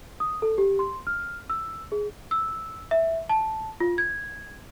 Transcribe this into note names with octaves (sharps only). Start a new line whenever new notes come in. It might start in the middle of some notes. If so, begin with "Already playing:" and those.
D#6
A4
G4
C6
F6
E6
G#4
E6
E5
A5
F4
G#6